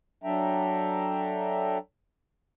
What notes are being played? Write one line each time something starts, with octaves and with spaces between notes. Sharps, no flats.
F#3 D4 A4 E5 G5 A#5